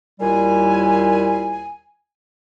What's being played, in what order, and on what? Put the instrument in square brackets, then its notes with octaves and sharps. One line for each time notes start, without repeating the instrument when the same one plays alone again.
[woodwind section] D#2 A#2 G3 E4 G#5